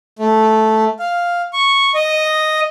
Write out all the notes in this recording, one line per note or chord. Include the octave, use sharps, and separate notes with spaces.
A3
F5
C#6
D#5